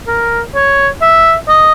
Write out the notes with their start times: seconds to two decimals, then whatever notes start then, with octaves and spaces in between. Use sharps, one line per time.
0.08 A#4
0.55 C#5
1.02 E5
1.48 D#5